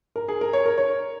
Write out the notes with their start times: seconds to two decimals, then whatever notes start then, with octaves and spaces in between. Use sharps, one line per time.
0.16 A#4
0.28 G#4
0.41 A#4
0.53 C#5
0.66 A#4
0.78 C#5